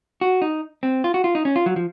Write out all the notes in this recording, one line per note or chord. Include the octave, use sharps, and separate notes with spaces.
F#4
D#4
C4
F4
F#4
F4
D#4
C#4
F4
F#3
F3